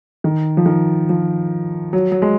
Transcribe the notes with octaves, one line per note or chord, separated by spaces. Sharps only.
D#3
F3
D#3
F3
F#3
F#3
G#3